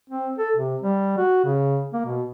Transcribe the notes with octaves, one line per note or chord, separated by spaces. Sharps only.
C4
A4
C3
G3
F#4
C#3
A#3
B2